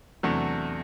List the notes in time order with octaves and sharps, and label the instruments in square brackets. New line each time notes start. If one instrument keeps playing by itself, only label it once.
[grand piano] E2 C3 F#3 A3 D4